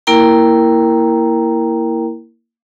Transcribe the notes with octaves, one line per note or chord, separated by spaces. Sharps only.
A#3 E4 A#4 G5 A#5